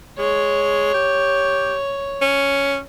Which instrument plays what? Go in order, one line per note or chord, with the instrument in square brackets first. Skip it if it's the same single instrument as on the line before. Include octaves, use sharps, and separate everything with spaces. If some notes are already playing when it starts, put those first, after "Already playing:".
[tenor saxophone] G#3 [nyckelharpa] C#5
[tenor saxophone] G4
C#4